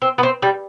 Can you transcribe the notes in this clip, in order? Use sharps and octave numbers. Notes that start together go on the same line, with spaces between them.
C4
B3
C4
G3